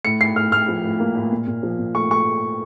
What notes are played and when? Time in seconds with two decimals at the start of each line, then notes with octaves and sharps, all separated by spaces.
0.05 A2 C#7
0.21 A2 C7
0.36 A2 F6
0.52 A2 F6
0.68 F3
0.84 A2
1.00 A#3
1.16 A2
1.32 A#2
1.47 A#2
1.63 F3
1.79 A#2
1.95 A3 C#6
2.10 A3 C#6